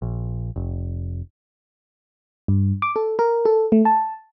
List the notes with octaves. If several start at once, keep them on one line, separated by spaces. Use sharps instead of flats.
A#1
F1
G2
D6
A4
A#4
A4
A3
A5